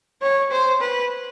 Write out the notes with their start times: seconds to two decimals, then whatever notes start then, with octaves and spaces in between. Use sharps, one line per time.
0.22 C#5
0.51 C5
0.81 B4